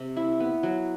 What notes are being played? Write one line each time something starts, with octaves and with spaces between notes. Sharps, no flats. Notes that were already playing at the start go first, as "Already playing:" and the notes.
Already playing: C3
E4
B3
F#3